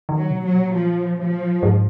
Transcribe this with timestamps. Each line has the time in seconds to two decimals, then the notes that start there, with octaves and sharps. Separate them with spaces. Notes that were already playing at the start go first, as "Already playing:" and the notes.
0.09 D#3
0.16 F#3
0.30 B2
0.45 F#3
0.53 A#2
0.74 F3
1.18 F3
1.63 G#2